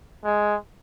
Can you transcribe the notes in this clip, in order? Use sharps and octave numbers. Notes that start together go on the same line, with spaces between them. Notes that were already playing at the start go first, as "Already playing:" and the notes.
G#3